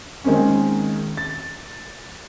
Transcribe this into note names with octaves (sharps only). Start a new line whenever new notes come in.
D#3 G#3 A#3 C4 C#4
A6